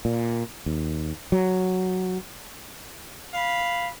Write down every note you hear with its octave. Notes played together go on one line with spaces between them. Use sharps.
A#2
D#2
F#3
F5 B5